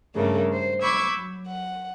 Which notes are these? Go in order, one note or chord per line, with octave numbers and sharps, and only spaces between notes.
G2 C#3 A3 A#3
C5
B5 C#6 D6 E6 G6 G#6
F#3
F#5